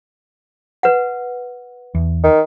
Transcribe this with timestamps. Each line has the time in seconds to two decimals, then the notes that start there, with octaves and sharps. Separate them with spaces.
0.83 B4 F#5
1.95 E2
2.24 D#3